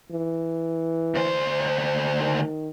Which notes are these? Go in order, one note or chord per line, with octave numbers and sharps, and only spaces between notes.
E3
D2 C5
D#3